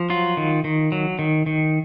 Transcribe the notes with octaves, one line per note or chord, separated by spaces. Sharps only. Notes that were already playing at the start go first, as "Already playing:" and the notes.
Already playing: F3
F#3 F4
D#3
D#3
F#3
D#3
D#3